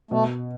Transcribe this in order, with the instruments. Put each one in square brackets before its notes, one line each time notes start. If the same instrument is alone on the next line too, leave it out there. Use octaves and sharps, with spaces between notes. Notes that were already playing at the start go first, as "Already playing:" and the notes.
[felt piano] B2 [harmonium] A3